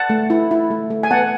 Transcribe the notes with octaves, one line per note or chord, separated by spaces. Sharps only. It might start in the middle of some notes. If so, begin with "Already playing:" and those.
Already playing: F#5 A5
A3
E4
E4
A3
A3
G#5
B3 F#5 A5